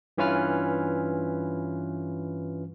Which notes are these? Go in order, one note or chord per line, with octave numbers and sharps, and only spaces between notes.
G2 E3 C#4 F4 B4 F6